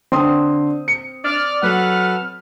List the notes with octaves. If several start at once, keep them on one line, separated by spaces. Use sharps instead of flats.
D3 C4 C6 D#6
C#7
D5 F6
F#3 A4 B4 F#5